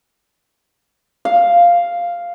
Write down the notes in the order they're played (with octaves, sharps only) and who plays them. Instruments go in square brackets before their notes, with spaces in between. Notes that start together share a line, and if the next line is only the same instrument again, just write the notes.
[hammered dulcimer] F5